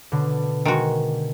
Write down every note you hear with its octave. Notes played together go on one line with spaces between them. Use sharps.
B2 D3
D#3 G#3 F#4